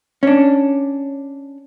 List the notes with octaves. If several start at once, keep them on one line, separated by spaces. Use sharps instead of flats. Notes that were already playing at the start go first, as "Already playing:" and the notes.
C#4 D4